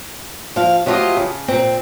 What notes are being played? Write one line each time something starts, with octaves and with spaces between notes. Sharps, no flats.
F3 F5
F3 F#3 A3 F4 G4 D#5
C#3
A#2 C4